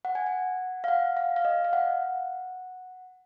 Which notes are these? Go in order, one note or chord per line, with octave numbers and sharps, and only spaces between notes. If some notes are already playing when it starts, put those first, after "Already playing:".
F#5
G#5
F#5
F5
F#5
F5
F5
D#5
F5
F#5